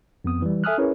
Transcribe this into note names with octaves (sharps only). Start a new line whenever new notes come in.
F2 B3 D#6
E3 G3
A4 E5 G#5 D#6 F6 F#6
C#4 E4 G#4 A#4 B4 C#5